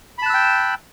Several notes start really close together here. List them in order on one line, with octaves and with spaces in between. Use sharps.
B5 A5 F#6 E6 G5